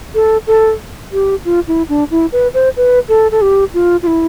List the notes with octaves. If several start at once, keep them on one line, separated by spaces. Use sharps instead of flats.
A4
A4
G4
F4
E4
D4
E4
B4
C5
B4
A4
A4
G4
F4
F4
E4